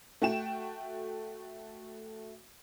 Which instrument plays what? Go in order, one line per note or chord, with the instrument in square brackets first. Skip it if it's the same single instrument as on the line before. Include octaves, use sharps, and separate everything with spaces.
[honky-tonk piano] A3 F#4 G5 E7